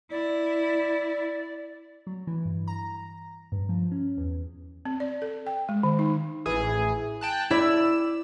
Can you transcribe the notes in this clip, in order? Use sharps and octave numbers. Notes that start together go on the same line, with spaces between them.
E4 D5
F#3
E3
G2
A#5
G2
F3
C#4
E2
C4
D5
A4
G5
G#3
D#3
D#4
A1 E3 G#4
G5 A5 F#6
E4 D5 E6